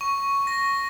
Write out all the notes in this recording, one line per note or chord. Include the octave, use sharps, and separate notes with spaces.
C#6
A#6